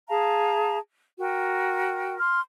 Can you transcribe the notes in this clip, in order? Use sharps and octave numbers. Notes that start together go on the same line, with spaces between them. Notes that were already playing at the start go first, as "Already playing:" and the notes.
G#4 F5 A5 A#5
F#4 A#4 G5
C6 F6